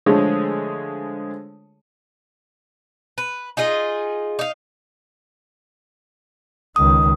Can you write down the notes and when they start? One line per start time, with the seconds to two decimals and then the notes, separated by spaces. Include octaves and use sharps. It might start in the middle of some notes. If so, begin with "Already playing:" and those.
0.06 D3 F3 G#3 A3 G#4 C#5
3.18 B4
3.57 D#4 F4 G#4 D#5
4.39 D#4 F5
6.76 C#2 D#3 D#6